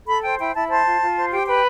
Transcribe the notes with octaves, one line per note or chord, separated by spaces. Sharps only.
A4 B5
C5 G5
E4 G5
E4 A5
C5 A5
F4
F4
C5
G4 G5
B4 G5